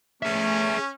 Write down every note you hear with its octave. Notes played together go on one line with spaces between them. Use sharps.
A3 C#4 G#4 E5